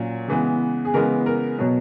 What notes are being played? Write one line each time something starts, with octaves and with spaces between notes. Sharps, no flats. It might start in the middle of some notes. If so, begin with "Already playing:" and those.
Already playing: A#2 F#3 C#4
C#3 E3 G#3 B3
G#4
C#3 E3 G#3 B3 A#4
A#4
B2 F#3 B3